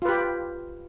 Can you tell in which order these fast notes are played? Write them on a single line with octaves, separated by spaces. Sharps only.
F4 B4 G4